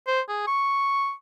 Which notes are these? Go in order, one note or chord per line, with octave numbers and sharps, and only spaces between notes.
C5
G#4
C#6